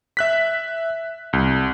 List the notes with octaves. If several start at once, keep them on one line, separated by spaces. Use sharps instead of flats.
E5 F#6 B6
C2